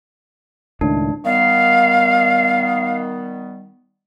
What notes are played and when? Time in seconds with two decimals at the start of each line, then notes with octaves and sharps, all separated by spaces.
0.81 C#2 A2 D#3 D4
1.25 D#3 G3 B3 F5